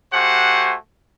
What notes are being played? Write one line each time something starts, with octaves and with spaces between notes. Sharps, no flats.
A3 F#4 G4 C5 F#5 G#5